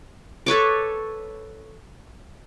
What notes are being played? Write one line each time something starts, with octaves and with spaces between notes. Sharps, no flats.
A4 B4 C#5 D6